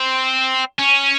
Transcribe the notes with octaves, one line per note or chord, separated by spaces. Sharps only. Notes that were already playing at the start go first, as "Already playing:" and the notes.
Already playing: C4
C#4